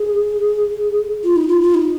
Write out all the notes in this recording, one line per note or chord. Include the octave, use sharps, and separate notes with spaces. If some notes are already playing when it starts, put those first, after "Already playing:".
Already playing: G#4
F4
D#4
F4
F4
D#4